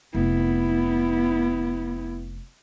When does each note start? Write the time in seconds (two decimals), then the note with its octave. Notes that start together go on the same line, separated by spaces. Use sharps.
0.14 F1 B3 E4